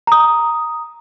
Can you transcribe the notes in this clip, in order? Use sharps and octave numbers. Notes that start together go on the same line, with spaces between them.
A#5 D#6